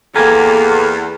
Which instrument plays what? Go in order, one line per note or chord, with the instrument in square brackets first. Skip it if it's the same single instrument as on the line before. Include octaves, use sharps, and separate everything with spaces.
[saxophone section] E2 [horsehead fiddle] A#3 [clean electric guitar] G4 A#4 G#5 [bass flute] A4